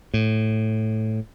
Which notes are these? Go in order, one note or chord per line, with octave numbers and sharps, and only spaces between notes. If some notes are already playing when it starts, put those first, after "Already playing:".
A2